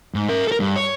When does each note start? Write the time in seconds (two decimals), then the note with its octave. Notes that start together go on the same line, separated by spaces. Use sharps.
0.15 G#2
0.29 A#4 E5
0.48 A4 A#4
0.60 G2
0.76 C#5